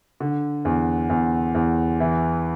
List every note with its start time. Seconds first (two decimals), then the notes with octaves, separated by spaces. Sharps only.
0.20 D3
0.65 E2
1.10 E2
1.55 E2
2.00 E3